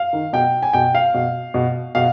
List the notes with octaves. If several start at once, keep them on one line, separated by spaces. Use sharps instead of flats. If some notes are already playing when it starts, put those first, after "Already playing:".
Already playing: F5
D#3
B2 G5
G#5
B2 G5
F5
B2
B2
B2 F5